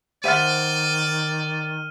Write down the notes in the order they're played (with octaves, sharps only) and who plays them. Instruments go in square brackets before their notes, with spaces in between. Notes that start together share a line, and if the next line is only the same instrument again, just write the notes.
[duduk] D#3 [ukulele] C5 E5 F#5 [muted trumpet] D5 [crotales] F6 D#7